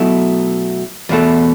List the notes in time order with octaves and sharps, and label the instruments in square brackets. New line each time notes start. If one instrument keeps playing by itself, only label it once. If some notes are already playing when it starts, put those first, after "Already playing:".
Already playing: [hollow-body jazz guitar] B2 F#3 A3 E4
E2 B2 A3